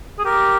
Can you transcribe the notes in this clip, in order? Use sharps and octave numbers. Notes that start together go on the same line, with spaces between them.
G#4
G4 A#4